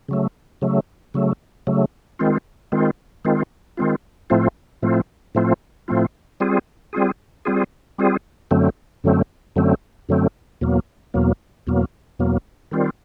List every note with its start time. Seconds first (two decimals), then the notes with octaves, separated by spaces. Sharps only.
0.08 C#3 F#3 A3
0.62 C#3 F#3 A3
1.14 C#3 F#3 A3
1.67 C#3 F#3 A3
2.19 D#3 G#3 C4 F4
2.72 D#3 G#3 C4 F4
3.25 D#3 G#3 C4 F4
3.77 D#3 G#3 C4 F4
4.30 A2 F3 A3 C4 F4
4.82 A2 F3 A3 C4 F4
5.35 A2 F3 A3 C4 F4
5.88 A2 F3 A3 C4 F4
6.40 G3 C4 F4 G#4
6.93 G3 C4 F4 G#4
7.45 G3 C4 F4 G#4
7.98 G3 C4 F4 G#4
8.51 F#2 D3 F#3 A3 C4
9.04 F#2 D3 F#3 A3 C4
9.56 F#2 D3 F#3 A3 C4
10.09 F#2 D3 F#3 A3 C4
10.61 E2 B2 F#3 A#3
11.14 E2 B2 F#3 A#3
11.67 E2 B2 F#3 A#3
12.19 E2 B2 F#3 A#3
12.71 D#3 G3 C4 F4